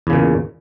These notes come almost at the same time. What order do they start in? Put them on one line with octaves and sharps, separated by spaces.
E2 C#3 A#2